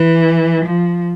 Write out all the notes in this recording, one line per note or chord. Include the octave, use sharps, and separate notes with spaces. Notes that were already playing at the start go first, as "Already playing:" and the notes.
Already playing: E3
F3